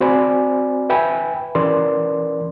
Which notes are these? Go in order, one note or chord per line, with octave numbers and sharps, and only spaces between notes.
C4 F#4 C5 D5 G#5 B5
B4 E5 G5 G#5 B5
E3 C#4 A#4 B4 D5 C6